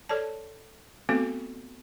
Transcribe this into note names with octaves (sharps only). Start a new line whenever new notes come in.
A4 C#5 D5 A5
A3 B3 C4 F#4 A4